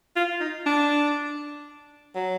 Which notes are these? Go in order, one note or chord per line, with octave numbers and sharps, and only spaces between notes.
F4
D#4
D4
F#3